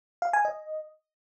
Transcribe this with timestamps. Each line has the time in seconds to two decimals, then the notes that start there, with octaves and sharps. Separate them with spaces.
0.22 F5
0.33 G#5
0.45 D#5